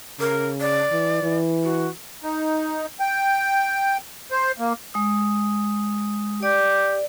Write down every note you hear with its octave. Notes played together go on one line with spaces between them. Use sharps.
C#3 A#4
D5
E3
E3
F#4
D#4
G5
C5
A#3
G#3 D#6
G4 D5